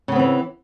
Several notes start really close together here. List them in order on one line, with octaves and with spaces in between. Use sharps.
C#3 B3 C4 E3